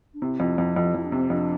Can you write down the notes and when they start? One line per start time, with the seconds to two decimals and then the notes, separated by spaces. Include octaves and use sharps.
0.14 D4
0.22 C3 E4
0.40 F2
0.58 F2
0.76 F2
0.95 F2 E4
1.05 D4
1.12 C3
1.18 C4
1.30 F2 D4